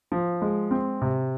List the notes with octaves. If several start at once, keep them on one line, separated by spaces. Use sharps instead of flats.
F3
G#3
C4
C3